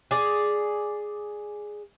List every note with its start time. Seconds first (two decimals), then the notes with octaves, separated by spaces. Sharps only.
0.11 G#4 D5